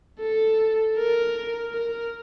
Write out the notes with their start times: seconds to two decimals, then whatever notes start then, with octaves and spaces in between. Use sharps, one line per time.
0.19 A4
0.96 A#4
1.73 A#4